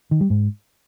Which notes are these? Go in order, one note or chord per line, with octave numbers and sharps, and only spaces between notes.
D#3
G3
G#2